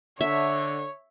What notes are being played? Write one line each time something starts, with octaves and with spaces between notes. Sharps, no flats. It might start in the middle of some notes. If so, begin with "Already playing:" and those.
D3 C#5 E5